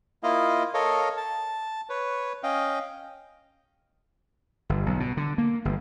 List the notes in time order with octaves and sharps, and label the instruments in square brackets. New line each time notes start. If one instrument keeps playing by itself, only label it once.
[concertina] A#3 E4 F4 D#5 F5
A4 A#4 C#5 D#5 F5
A5
B4 C#5
C#4 D#5 F5 G5
[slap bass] G1
B1
B2
D3
A#3
G1